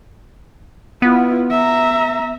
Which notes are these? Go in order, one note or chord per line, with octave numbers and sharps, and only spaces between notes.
B3 E4 F4
E5 A#5